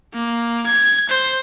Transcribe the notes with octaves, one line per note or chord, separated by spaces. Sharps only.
A#3
G#6
C5